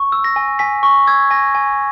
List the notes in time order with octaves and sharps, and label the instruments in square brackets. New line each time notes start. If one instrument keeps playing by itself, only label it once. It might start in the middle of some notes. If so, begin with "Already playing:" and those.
Already playing: [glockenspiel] C#6
E6
A#6
G#5
G#5 B6
C#6
E6 G#6
G#5 A#6
G#5